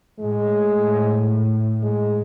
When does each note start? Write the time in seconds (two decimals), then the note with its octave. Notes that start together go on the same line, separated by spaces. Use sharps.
0.20 A2 G#3
1.83 G#3